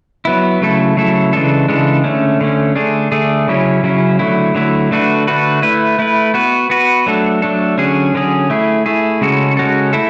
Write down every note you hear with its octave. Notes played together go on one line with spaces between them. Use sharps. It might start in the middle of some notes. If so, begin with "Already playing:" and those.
F#3 B3 E4
C#3 F#3 A3 E4 A4
C#3 F#3 A3 E4 A4
C#3 E3 G#3 D4 A4
C#3 E3 G#3 D4 A4
D3 A3 C#4
D3 A3 C#4
D3 A3 D4 G#4
D3 A3 D4 G#4
C#3 F#3 C#4 E4
C#3 F#3 C#4 E4
D3 F#3 A3 E4
D3 F#3 A3 E4
D3 A3 D4 F#4 B4
D3 A3 D4 F#4 B4
A3 E4 B4
A3 E4 B4
B3 F#4 B4
B3 F#4 B4
F#3 A3 D4 A4
F#3 A3 D4 A4
D3 F#3 C#4 G#4
D3 F#3 C#4 G#4
A3 E4 G#4
A3 E4 G#4
C#3 G#3 C#4 F#4 A4
C#3 G#3 C#4 F#4 A4
A3 E4 A4